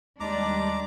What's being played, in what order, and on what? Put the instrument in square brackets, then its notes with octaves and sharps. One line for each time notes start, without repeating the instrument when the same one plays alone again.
[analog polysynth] D#2 G3 [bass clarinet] G#3 [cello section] D4 [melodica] A#5 D6